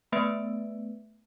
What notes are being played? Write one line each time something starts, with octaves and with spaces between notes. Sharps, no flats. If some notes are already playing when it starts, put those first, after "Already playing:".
A3 B3 B4 E5 D7